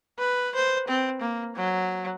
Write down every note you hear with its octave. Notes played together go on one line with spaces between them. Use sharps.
B4
C5
C4
A#3
F#3